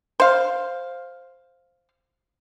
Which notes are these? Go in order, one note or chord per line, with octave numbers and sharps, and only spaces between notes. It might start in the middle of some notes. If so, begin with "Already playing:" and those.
C5 F5